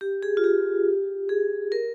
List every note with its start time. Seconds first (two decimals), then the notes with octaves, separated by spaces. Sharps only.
0.01 G4
0.23 G#4
0.37 F4
0.44 G4
1.29 G#4
1.72 A#4